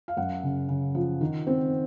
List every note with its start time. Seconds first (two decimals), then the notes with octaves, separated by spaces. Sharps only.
0.08 F5
0.17 F#2 F#5
0.43 C#3
0.69 C#3
0.95 F3
1.21 D#3
1.47 C4